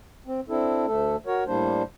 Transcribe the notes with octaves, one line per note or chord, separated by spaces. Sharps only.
C4
C4 D4 E4 A4
D2 A3 A4
F#4 A#4 C#5
A2 G3 A#3 D4 C5